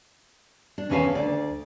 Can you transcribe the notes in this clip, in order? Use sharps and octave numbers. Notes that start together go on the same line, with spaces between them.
D4
E2 D#3 C#4 B4 F5 A5
D2 D5